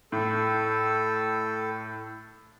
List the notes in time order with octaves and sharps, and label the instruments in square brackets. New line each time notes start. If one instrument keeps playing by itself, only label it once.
[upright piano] A2 [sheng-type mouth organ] A4